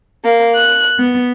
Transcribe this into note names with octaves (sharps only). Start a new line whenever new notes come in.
A#3
F#6
B3